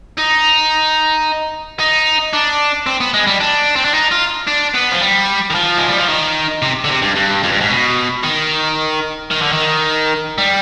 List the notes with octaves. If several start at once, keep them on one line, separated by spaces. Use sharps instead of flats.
D#4
D#4
D4
C4
B3
G#3
G3
D4
C4
D4
D#4
F4
D4
B3
F3
G3
D#3
F3
G#3
G3
F3
D#3
C3
D3
C3
G2
G2
F2
G2
G#2
B2
D#3
D#3
D3
D#3
G3